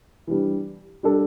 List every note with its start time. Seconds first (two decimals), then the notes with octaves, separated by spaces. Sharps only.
0.27 E3 G3 D4
1.03 G3 D4 A4